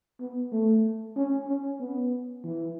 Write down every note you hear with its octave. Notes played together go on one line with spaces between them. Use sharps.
B3
A3
C#4
C#4
B3
E3